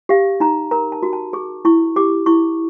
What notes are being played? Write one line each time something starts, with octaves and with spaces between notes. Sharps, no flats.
G4 F5
D#4 A#5
A#4 A#5
A5
F#4
A5
G#4 C#6
E4 C#6
G4 D6
E4 C#6